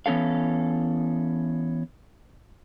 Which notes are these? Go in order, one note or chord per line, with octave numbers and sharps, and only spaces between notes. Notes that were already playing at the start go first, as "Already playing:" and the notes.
E3 B3 C#4 A4 F5